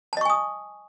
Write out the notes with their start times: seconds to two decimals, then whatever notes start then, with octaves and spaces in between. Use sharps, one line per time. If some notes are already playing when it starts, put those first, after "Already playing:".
0.13 A5
0.17 D#5
0.21 C#6
0.25 G#5
0.30 D#6